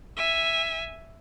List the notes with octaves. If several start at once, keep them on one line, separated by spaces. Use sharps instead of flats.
E5 G#5